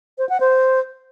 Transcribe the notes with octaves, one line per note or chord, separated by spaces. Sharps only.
C5
F#5
C5